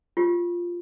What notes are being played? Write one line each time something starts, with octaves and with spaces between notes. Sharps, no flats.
F4 G4